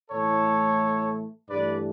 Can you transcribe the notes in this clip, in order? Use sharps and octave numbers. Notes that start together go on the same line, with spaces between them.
A2 E3 A3 A4 C#5
G2 E3 A3 B4 D5